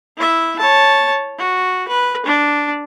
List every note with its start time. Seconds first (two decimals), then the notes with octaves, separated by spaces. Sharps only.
0.17 E4 E5
0.59 C#5 A5
1.38 F#4
1.88 B4
2.26 D4